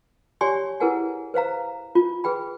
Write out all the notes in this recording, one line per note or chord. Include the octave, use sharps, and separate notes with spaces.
G4 C#5 D5 G#5 C6 C#6
E4 G#4 A#4 B4 F#5 G#5
B4 C5 F5 A#5
F4
G#4 B4 G5 B5